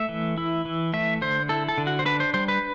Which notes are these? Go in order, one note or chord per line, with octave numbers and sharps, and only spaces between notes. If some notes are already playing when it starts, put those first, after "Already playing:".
Already playing: A3 E5
E3
E4
E3
A3 E5
D3 C5
E4 A4
A4
D3
F#4
C5
D4 B4
C5
G3 C5
B4